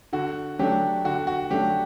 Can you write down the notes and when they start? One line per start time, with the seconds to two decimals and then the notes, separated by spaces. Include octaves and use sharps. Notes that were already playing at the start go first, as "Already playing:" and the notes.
0.13 D3 F#4
0.59 F#3 A3 D4 G4
1.05 D3 F#4
1.27 F#4
1.50 F#3 A3 D4 G4